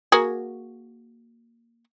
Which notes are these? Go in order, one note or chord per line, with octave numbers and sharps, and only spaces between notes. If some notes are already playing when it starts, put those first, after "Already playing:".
A#3 F#4 G#4